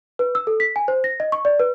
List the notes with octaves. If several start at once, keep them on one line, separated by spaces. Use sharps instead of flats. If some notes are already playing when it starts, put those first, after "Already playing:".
B4
E6
A4
B6
G#5
C5
A#6
D#5
C#6
D5
B4